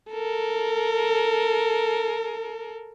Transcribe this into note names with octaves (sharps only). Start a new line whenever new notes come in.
A4 A#4